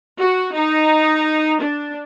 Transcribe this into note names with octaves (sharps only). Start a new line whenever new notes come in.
F#4
D#4
D4